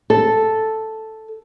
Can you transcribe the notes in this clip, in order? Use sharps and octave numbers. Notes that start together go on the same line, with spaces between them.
A4